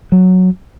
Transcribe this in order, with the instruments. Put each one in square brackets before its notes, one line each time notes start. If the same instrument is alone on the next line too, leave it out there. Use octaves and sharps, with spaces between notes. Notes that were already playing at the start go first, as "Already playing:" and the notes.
[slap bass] F#3